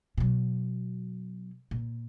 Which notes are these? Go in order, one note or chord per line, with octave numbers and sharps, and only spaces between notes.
B2 F#3
A#2